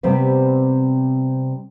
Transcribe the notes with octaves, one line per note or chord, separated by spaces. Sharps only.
C3 G3 B3 C4 G4 B4